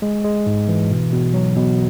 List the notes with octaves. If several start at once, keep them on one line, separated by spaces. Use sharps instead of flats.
G#3
G#3
G#2
E3
B2
B2
F#3
B2